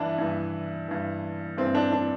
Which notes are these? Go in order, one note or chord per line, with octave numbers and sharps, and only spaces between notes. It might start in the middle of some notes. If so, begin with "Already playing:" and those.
Already playing: G2 E3 D4 E4
G2 E3
G2 E3
G2 E3 C4
D4
D4